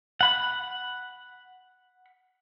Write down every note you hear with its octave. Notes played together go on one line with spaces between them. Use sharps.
F#5 B5